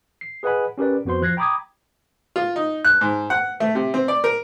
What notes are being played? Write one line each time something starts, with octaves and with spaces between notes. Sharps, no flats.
C7
G#4 B4 D#5 F#5 G#5 B5
C#4 G4 A#4 B4 D5
F2 B3 F#4 C5 C6
F3 F#6 G#6 A#6 C7
G5 A#5 B5 D6 D#6 G#6
F4
D#4
F#6
G#2
F#5
A3
C3
C4
D5
A#4